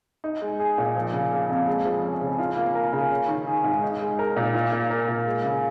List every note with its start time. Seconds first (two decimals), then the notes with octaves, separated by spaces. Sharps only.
0.24 D#4
0.41 G#3
0.60 G#4
0.78 A#2
0.96 F3
1.13 C#3
1.32 A#3
1.49 F2
1.67 G#3
1.85 F3
2.03 C#4
2.21 C#3
2.39 F4
2.57 A#3
2.75 A#4
2.93 C#3
3.11 C#4
3.28 D#3
3.47 G#4
3.64 G#2
3.83 D#4
4.01 G#3
4.19 A#4
4.36 A#2
4.54 F4
4.72 A#3
4.90 A#4
5.08 A#2
5.27 G#3
5.44 C#3